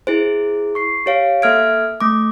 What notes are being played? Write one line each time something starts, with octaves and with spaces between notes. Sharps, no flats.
E4 G#4 C5
C#6 C7
G4 C#5 F5
A#3 A4 E5 F6 G#6 D7
A3 D6